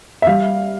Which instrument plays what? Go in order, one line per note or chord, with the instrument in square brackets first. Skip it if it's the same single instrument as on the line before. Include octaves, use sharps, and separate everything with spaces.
[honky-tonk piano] E5
G3 F5